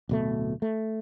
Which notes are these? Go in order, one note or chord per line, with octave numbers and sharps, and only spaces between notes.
D1 B2 A3
A3